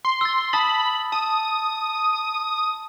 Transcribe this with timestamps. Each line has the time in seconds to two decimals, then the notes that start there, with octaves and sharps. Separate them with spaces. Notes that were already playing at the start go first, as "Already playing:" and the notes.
0.05 C6
0.21 E6 A6
0.53 A5 B5 D#6 A6
1.12 A5 D#6